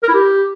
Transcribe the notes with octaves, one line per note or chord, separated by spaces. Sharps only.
A#4
E4
G4